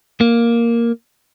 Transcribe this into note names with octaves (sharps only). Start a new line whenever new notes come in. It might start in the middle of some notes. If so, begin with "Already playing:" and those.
A#3